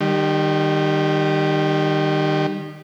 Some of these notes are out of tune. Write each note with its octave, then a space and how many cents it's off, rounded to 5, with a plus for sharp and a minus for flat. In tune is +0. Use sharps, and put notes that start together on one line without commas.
D#3 -30 G3 +0